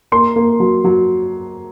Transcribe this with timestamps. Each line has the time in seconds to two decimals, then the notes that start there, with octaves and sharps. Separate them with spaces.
0.12 A#3 C6
0.36 A#3
0.60 F#3
0.84 F#3